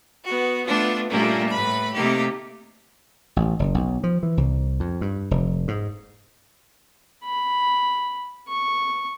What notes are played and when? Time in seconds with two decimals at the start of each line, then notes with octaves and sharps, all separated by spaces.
0.25 B3 F#4
0.65 A3 B3 D4 F4
1.10 A#2 G3 A3 A#3 C#4 D4
1.50 A2 B4 B5
1.93 C3 A3 A#3 D#4 G4
3.36 A1
3.59 F#1
3.75 B1
4.04 F3
4.23 E3
4.37 C2
4.80 F2
5.01 G2
5.31 F1
5.68 G#2
7.25 B5
8.49 C#6